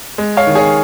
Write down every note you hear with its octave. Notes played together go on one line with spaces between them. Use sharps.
G#3
C#5 F5
D#3
G#4 C#5